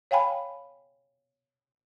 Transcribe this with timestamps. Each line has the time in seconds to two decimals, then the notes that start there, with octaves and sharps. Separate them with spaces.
0.11 C#5 F5 G5 G#5 B5